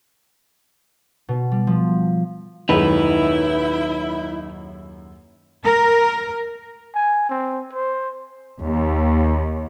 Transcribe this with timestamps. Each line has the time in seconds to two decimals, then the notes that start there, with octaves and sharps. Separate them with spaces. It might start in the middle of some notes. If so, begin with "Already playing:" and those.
1.29 B2
1.52 G3
1.67 F3
2.69 D#1 F#2 G#3 D#4 E4 B4
5.63 A#4
6.95 G#5
7.30 C4
7.73 C5
8.61 D#2